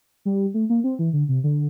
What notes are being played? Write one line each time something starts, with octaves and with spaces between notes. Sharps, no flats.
G3
A3
A#3
C4
E3
D3
C3
D3